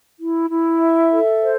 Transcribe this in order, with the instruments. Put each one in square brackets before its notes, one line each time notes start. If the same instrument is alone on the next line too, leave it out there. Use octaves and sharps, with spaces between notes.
[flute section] E4
E4
E5
A4
C5